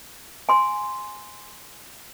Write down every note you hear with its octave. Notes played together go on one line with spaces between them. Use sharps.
G#5 C6